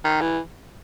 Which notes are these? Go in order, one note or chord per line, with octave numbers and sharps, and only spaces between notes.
D#3
E3